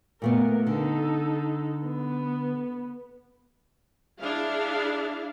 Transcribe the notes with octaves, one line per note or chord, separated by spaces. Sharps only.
A#2 A3 B3 A#4
D3 D#4 A4
B3
D4 E4 G#4 F5